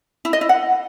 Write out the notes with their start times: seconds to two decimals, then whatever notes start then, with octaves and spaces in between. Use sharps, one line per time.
0.25 E4
0.33 D#5
0.41 E4
0.49 F#5